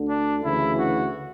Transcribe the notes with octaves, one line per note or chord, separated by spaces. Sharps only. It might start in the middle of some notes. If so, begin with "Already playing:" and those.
Already playing: D2 D3
D4
D2 C#3 E3 E4
F#4